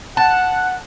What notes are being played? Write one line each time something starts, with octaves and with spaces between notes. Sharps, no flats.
F#5 A5